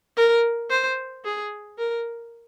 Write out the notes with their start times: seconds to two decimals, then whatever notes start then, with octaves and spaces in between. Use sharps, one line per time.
0.17 A#4
0.70 C5
1.24 G#4
1.78 A#4